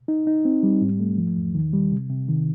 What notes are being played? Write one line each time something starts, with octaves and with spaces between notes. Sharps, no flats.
D#4
D#4
C4
G3
G#2
A3
F3
E2
D#3
G3
C3
C3
D#3